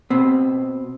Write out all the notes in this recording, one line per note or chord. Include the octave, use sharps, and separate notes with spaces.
B2 C4